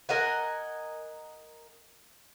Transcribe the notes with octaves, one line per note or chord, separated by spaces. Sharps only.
A#4 D#5 F#5 G#5